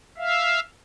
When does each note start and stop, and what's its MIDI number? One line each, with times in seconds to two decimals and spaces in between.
0.17 0.60 76
0.17 0.60 77